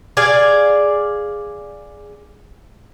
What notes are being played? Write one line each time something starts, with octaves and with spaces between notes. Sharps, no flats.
G#4 D5 F5 G#5